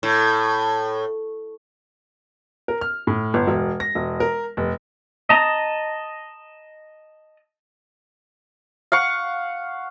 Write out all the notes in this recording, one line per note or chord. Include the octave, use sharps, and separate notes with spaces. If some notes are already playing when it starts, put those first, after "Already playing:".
A2
A#4
F6
A2
G1
E1
A#6
E1
A#4
F1
D#5 A5 A#5
F5 F#5 C#6